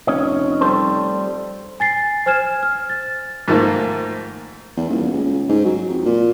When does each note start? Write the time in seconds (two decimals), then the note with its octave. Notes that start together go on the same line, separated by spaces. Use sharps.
0.07 F1 C#4 C#5 D#5
0.61 G3 A4 C5
1.80 G#5 A6 C7
2.26 C5 G#5 F6 G#6 E7
2.63 F6
2.89 A6
3.48 G#2 D#3 F3 A3 A#3
4.77 E2
4.90 D#1
5.13 C#2
5.49 G#2
5.65 F#3
5.89 F2
6.05 A#2